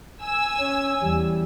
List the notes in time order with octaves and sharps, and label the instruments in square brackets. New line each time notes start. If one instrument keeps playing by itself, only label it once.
[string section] G#5 E6
[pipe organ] C#4
E2 G3